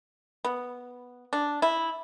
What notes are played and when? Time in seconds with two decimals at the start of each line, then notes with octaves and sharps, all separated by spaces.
0.45 B3
1.33 D4
1.62 E4